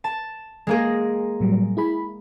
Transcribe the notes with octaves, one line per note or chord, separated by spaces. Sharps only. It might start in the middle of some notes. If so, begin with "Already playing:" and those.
A5
G#3 A#3 G#4
A2 F#3 G3
E4 G#4 B5